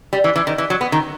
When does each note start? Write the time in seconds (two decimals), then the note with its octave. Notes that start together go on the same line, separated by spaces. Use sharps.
0.13 G3
0.24 E3
0.36 E3
0.47 D#3
0.58 E3
0.70 F#3
0.81 B3
0.92 D#3